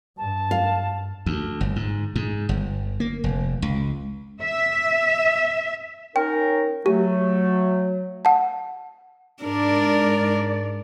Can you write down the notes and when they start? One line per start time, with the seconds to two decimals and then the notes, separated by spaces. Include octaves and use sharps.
0.18 G2 A5
0.51 F5
1.26 D2
1.61 G1
1.76 G#2
2.16 G#2
2.49 G1
3.00 A#3
3.24 F1
3.62 C#2
4.41 E5
6.16 C#4 D#4 A#4 G5
6.86 F#3 A3 G4
8.25 F#5 A5
9.43 G#2 D4 A#4 D5